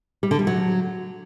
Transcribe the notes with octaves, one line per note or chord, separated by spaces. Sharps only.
G3
D3
G3
F#3